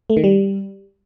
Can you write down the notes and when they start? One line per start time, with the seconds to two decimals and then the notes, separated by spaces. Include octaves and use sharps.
0.10 A3
0.17 D#3
0.24 G3